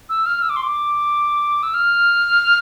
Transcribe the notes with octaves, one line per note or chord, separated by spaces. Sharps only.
E6
F6
E6
D6
C6
D6
E6
F6